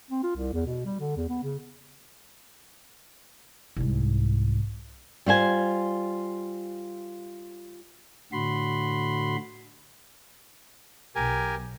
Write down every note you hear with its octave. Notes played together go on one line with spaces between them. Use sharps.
C4
F4
C2
E2
B2
G3
D3
E2
B3
C#3
C2 G#2
G3 F4 C5 G#5
A2 D3 F#4 B5 C6
B1 G4 A#4 G#5